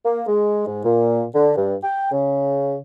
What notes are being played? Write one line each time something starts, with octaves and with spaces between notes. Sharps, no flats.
A#3
G#3
G#2
A#2
D3
G2
G5
C#3